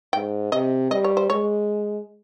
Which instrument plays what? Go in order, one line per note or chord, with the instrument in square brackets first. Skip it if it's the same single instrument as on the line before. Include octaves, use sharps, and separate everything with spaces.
[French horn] G#2 [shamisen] G5
[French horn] C3 [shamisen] D#5
[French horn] G3 [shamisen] D#5
[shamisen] C#5
C5
[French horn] G#3 [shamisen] C#5